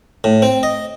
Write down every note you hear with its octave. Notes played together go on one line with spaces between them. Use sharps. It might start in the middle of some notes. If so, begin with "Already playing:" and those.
A2
C4
D#5